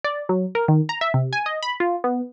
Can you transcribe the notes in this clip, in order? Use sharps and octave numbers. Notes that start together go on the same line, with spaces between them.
D5
F#3
A#4
D#3
A#5
E5
C3
G#5
D#5
B5
F4
B3